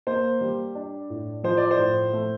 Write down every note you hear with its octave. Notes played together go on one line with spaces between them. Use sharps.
A#3 C5
G3
D4
A2
F3 C5
D5
C5
A2
A3